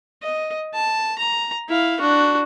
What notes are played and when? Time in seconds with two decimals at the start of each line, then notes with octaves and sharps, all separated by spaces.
0.23 D#5
0.74 A5
1.19 A#5
1.69 E4 F5
2.00 D4 F#4